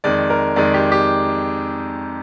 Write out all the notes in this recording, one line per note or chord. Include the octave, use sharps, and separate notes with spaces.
F2 D#3 G#3 D5
A#4
F2 D#3 G#3 D5
G4
G4